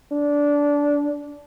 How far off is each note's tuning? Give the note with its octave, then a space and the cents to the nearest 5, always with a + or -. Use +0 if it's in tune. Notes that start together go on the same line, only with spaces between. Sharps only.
D4 -15